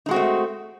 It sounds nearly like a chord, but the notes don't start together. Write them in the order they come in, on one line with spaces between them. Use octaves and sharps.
D#4 G#3 F#4 C4 A3